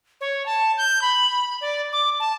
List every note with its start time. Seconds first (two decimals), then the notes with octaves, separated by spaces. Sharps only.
0.21 C#5
0.46 A5
0.78 G6
1.02 B5
1.61 D5
1.93 D6
2.20 A5